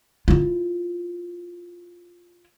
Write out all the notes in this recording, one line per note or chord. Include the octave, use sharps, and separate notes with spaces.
E4 F4